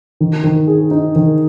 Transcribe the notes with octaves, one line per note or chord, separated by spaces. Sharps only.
D#3
D#3
G#4
D#4
D#3